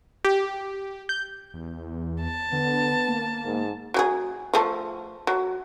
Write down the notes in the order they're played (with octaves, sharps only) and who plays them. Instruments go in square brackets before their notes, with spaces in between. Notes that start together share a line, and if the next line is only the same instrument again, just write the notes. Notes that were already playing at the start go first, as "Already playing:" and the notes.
[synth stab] G4
G6
[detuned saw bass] E2
[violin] A5
[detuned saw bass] D3 [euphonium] B3
[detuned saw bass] A#3
[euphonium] G#2
[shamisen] F#3 G4 G#4
F3 A3 A4
F#3